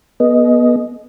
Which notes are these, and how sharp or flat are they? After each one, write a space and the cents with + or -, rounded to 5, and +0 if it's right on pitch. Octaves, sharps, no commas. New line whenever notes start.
B3 -25 G#4 +40 D#5 +0